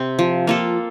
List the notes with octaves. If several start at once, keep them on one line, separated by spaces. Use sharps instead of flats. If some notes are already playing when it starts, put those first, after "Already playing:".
Already playing: C3 C4
F3
A#3 F4 A4